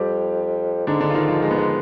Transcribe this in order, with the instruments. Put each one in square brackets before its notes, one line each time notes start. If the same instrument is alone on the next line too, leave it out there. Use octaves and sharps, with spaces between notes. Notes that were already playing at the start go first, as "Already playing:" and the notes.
Already playing: [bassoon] F2 [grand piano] G3 G4
[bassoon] G#2 [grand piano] D3 D4
[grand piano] D3 D4
F4
D#3 D#4
F3 F4
G#3
B3
G#3